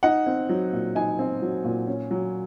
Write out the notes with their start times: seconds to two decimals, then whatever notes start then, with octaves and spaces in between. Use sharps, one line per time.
0.03 D#4 F#5
0.27 C4
0.49 F#3
0.73 A#2
0.95 D#4 G#5
1.19 C4
1.42 F#3
1.64 A#2
1.87 C#4
2.11 F#3